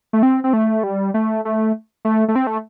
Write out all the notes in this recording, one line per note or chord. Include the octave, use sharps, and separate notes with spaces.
A3
C4
C4
A3
G3
A3
A3
A3
A3
C4
A3